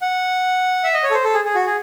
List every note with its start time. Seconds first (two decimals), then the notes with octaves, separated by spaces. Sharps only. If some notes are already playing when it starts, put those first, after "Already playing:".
0.02 F#5
0.84 E5
0.94 D#5
1.03 C#5
1.10 A4
1.14 C5
1.25 A4
1.34 G#4
1.45 G#4
1.55 F#4
1.66 G#4